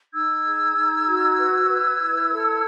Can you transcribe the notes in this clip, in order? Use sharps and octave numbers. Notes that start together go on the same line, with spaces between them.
D#4 E6 G#6
G#4
D#4
F#4
B4
B4
E4
A4